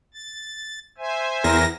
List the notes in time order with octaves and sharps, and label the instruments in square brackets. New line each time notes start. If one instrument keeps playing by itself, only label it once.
[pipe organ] A6
C5 E5 G#5
[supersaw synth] E2 A#6 [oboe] A#4